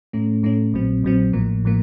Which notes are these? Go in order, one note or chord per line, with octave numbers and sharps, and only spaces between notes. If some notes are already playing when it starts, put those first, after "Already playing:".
A2 A3 C#4
A2 A3 C#4
A#1 A#2 F#3 C4
A#1 A#2 F#3 C4
A1 A2 F3 A#3
A2 F3 A#3